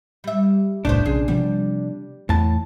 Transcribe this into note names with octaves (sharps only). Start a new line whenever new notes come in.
G3 E5
D#1 C2 A2 A3 B3 D4 C5
A#1 C3 C#4 G#4
C3 F3 G3 B3
E2 A2 A5